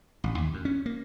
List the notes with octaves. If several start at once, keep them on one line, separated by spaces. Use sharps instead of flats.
A1
D#2
F#2
C#4
A#3